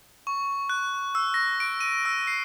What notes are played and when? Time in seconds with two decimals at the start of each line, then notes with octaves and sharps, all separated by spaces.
0.27 C#6
0.69 F#6
1.15 E6
1.34 A#6
1.60 D7
1.81 D#7
2.05 E6
2.27 C7